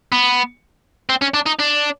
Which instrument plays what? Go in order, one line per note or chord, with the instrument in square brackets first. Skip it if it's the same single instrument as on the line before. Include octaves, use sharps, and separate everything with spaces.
[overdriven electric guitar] B3
C4
C#4
D4
D#4
D4